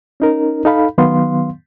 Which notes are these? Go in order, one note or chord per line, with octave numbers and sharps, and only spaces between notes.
C#4 D#4 A#4
D#4 A4 F5 B5
D#3 F#3 B3 F5 C6